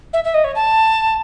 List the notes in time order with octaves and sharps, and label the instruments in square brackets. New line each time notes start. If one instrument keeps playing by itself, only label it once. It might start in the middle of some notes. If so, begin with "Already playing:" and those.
[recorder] E5
E5
D#5
C#5
A5